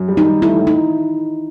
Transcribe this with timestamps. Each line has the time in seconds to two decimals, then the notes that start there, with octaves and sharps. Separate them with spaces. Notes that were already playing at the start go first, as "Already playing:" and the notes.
Already playing: F#2
0.08 G3
0.17 D#4
0.26 G3
0.42 A3 E4
0.59 A2
0.67 D#4